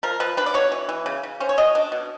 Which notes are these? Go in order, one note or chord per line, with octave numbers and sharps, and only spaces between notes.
F3 A#4
F3 B4
D4 B4
D5
B2 C#5
E3
E3
C#3
C#3
C#4 C5
C#5
B2 D#5
D4
B2